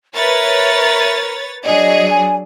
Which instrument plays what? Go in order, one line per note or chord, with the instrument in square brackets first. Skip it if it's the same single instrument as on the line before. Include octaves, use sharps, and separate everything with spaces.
[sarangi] A#4 [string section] B4 C#5 A6 [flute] E5
[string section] F#3 G#4 [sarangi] D4 [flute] D#5
[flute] G#5